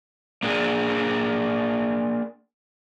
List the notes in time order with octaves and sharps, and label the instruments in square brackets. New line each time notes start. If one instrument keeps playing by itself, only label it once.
[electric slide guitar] A#3 D4 G#4